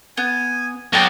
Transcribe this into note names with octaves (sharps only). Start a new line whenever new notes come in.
B3 G#5
B1 F#4 G5 A5